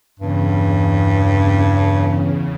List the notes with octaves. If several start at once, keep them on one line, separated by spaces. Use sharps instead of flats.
E2 G2 C#3